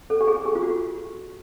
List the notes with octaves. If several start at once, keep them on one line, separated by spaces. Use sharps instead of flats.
A4
G4
G#4
G4
F4
F#4